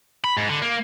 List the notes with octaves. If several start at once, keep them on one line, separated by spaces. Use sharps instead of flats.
B5
G#2
D3
A#3